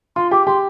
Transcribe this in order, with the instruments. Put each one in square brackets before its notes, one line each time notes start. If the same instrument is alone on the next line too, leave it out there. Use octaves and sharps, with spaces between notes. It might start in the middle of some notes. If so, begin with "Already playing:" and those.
[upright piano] F4 [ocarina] C6
[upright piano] G4 [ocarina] D6
[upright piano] G4 [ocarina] C6